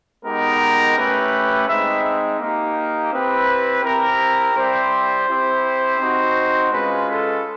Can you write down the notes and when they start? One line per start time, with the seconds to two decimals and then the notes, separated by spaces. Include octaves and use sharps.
0.25 G#3 B3 D#4 G4 A#4
0.97 A3 C#4 E4 G4 B4
1.68 G#3 C4 D#4 E5
2.40 A#3 D#4 G4
3.12 C4 E4 G4 B4
3.83 C4 E4 G4 A#4
4.56 G3 C4 E4 G4 C5
5.28 C4 E4 G4
5.99 C4 D#4 F#4
6.71 G#3 C#4 F4 B4
7.08 A4